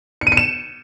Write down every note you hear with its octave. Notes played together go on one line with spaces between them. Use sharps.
C#7
D#7
C#7
E7